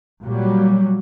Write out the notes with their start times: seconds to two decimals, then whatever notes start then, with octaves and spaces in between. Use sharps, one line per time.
0.25 A#2 F#3 G3